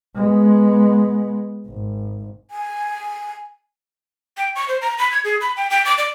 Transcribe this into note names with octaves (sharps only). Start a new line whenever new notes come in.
G#3 B3
G#1
G#5
G5
C#6
C5
A#5
B5
G#6
G#4
B5
G5
G5
D6
D5